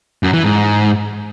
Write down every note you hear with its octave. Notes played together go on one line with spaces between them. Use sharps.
F#2
E3
G#2